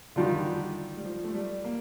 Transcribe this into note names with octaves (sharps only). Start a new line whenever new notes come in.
D3 D#3 G3 D4 F4
G3
F3
A3
G3
A#3